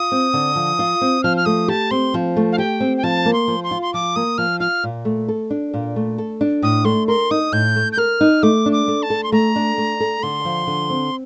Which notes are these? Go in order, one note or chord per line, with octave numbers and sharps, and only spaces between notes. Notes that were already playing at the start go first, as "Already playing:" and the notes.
Already playing: F4 D#6
C4
D3
F3
F4
C4
F3 F6
F6
A3 D#6
G4 A5
C4 C6
F3
A3
F5
G4 G5
C4
G5
F3 A5
A#3
C6
F3
C6
F4
C6
F3 D6
A#3 D#6
F3 F6
F4 F6
A#2
A3
A4
D4
A#2
A3
A4
D4
A2 D#6
A3 C6
A#4 C6
D#4 D#6
A2 G6
A3
G6
A#4 F6
D#4
A3 D6
D4
D6
A3
A5
A4
C6
A3 A#5
D4
A3
A4
D3 C6
F3
D3
C4